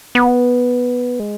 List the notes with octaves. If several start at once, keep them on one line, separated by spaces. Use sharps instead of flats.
B3
G#3